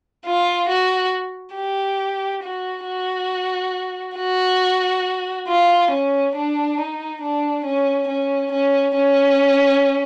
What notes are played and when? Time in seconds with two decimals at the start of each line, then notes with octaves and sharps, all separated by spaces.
0.26 F4
0.70 F#4
1.56 G4
2.44 F#4
2.87 F#4
4.17 F#4
5.48 F4
5.92 C#4
6.36 D4
6.78 D#4
7.22 D4
7.65 C#4
8.08 C#4
8.52 C#4
8.96 C#4